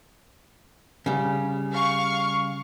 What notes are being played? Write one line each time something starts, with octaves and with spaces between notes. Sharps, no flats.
C#3 G3
F5 C#6